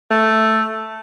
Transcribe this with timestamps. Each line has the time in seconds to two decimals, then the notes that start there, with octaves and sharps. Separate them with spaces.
0.11 A3